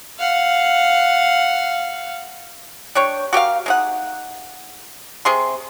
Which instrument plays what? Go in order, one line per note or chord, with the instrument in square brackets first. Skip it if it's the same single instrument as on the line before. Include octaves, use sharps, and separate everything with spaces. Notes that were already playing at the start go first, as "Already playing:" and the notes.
[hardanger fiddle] F5 F#5
[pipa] G3 D4 C#5 G5
F#4 G4 A#4 F5
G#3 D#4 F#5
C3 G#4 C6